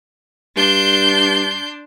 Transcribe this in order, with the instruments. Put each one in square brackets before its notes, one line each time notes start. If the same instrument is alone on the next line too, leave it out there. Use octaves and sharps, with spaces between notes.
[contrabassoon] G2 [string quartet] D4 C6 G6